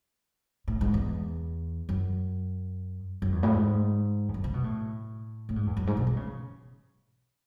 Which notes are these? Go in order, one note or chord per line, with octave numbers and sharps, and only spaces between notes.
A2
G#2
E2
F#2
F#2
E2
A2
G#2
E2
F#2
C#3
B2
A2
A2
G#2
E2
F#2
G#2
B2
E3
C#3